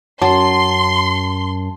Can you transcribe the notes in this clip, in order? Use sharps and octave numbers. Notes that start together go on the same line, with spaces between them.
F#2 F#3 A5 C6